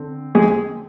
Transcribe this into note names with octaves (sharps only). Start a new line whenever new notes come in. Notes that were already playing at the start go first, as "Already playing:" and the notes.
Already playing: D3 C4
G#3 G#4